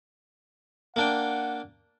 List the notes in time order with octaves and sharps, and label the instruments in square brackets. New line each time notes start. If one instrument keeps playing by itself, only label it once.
[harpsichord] A#3 D4 G5 [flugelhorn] F#5